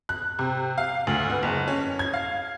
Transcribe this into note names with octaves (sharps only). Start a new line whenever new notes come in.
F#6
C3
F5
D2
B3
F#1
C#4
G#6
F5